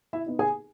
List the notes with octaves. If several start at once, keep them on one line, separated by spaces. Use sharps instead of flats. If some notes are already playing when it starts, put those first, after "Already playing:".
E4 E5
B3 D#4
G#4 G#5